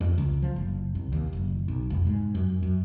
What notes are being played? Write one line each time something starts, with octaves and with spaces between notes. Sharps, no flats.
F2
C#2
F3
F#1
C2
D#2
F#1
B1
F1
G#2
F#2
F#2